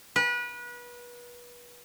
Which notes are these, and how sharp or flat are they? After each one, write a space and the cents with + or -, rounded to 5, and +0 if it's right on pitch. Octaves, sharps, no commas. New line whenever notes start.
B4 -30